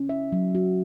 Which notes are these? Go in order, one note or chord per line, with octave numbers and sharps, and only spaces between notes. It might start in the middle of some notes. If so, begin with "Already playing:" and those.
Already playing: C#4
E5
F#3
F#4